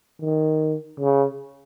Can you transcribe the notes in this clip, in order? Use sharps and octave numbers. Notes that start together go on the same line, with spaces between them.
D#3
C#3